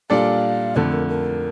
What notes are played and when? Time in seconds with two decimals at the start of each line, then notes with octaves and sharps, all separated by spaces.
0.10 A#2 G3 D4 A4 D5 F5
0.76 F2 D3 A3 A4
0.92 A#4
1.08 A#4